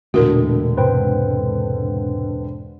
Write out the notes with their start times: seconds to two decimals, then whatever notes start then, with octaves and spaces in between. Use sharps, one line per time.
0.14 E1 A#2 D3 A3 F#4 A#4
0.78 G#2 C3 B4 C5 G5